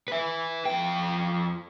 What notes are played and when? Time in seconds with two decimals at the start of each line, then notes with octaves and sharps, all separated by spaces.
0.08 B4 E5
0.65 F2 G5